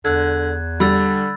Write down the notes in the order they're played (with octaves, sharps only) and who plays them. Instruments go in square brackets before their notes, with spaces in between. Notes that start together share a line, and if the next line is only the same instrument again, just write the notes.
[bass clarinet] E2 [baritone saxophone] D3 [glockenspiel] F#6 G#6
[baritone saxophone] D3 [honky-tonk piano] G3 [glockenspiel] B5 E6 A6